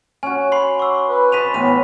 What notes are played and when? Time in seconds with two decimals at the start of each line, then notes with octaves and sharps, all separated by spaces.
0.23 C#4 F#4 G#5
0.52 B5 C6 C7
0.79 C#6 D6 E6
1.08 B4
1.32 C5 D#5 A5 B6 D#7 F7
1.54 A2 E3 B3 D#7 F7